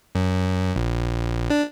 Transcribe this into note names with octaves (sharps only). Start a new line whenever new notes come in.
F#2
A#1
D4